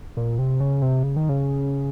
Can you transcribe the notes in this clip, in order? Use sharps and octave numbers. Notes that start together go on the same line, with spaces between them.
A#2
C3
C#3
C3
C#3
D#3
C#3